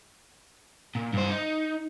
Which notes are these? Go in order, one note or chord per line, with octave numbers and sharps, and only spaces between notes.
A#2
G2 C5
D#4